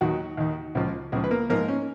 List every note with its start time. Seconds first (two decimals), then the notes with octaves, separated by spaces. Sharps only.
0.01 D#2 D#3 F#3 F#4
0.37 D#2 D#3
0.75 C#2 C#3 F3
1.12 C#2 C#3 F3 G#3 G#4
1.24 B4
1.31 A#3 A#4
1.50 G#2 F3 A#3 A#4
1.68 C#4